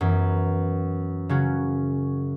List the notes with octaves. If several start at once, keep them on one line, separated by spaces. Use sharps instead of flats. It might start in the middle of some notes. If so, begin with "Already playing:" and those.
F#2 E3 B3
C#3 F#3 C#4 F#4